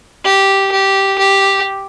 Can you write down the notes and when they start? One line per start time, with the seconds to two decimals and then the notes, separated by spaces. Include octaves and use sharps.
0.25 G4
0.72 G4
1.19 G4